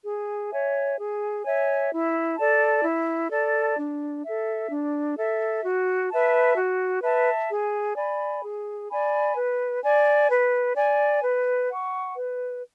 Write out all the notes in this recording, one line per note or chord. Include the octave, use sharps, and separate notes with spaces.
G#4
C#5 E5 G#5
G#4
C#5 E5 G#5
E4
A4 D5 A5
E4
A4 D5 A5
D4
E5
A4
D4
A4 E5
F#4
B4 E5 A5
F#4
B4 E5 A5
G#4
D5 G#5 B5
G#4
D5 G#5 B5
B4
D5 G#5
B4
D5 G#5
B4
F#5 C#6
B4